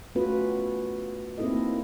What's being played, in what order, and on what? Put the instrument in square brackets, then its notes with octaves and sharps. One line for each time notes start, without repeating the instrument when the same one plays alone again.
[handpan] A3 B3 C#4 F4 F#4 B4
A#3 C4 D#4 E4 A4 D#5